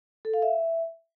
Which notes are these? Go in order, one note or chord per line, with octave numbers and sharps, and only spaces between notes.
A4
F5
E5